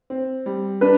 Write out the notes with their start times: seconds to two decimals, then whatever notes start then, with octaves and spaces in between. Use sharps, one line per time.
0.10 C4
0.46 G3
0.81 D4 B4